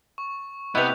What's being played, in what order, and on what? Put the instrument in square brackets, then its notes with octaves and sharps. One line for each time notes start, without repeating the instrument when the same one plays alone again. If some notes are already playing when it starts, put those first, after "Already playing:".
[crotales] C#6
[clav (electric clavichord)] C3 E4 [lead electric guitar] B3 [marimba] B4 D#5 [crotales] F#6 G6 F7